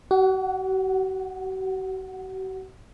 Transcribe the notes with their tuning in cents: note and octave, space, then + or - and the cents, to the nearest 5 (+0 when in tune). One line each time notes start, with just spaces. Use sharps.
F#4 +45 F#5 +0